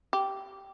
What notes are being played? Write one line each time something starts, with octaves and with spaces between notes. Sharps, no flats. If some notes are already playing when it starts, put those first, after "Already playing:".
G4